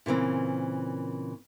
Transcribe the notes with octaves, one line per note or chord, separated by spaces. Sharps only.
A#2 C#3 E3 C4